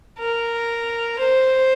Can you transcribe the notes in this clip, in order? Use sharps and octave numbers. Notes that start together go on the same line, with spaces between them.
A#4
C5